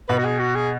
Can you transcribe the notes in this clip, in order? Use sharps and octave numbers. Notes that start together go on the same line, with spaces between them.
B2 B4
F#4
G#4
F#4
G#4